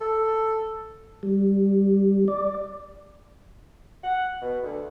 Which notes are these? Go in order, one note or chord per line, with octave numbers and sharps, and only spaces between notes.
A4
G3
D5
F#5
B2
D2